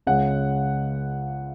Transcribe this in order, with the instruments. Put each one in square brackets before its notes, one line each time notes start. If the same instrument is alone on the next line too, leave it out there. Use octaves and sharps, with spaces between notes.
[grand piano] C#2 C#3 G#3 C#4 F#5